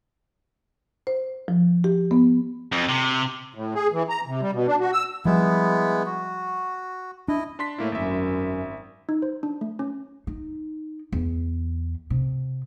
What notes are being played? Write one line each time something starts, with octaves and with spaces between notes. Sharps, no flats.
C5
F3
G4
B3
F2
C3
A2
G#4
E3
A#5
C3
G3
B2
D4
F#4
E6
F3 G3 G#3 B3 E4
F#4
D4 E4 D#5
D4 C6 B6
A2 A3 A#3 E4
G#1 F#2 E5
D#4
C5
D4
A3
C#4
D#4
E2
C3